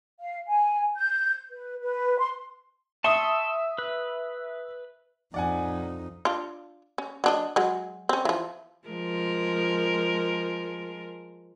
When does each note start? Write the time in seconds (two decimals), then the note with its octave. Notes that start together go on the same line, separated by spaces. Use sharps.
0.19 F5
0.47 G#5
0.95 G6
1.51 B4
1.80 B4
2.18 C6
3.04 E5 A5 C6 C#6 D#6
3.78 B4
5.34 F2 D#4 D5 F#5 G#5
6.25 D4 F4
6.98 C#4
7.24 F#3 D4 D#5
7.56 F#3 G#3
8.09 C4 C#4
8.25 E3 F3
8.88 F3 G#3 A#4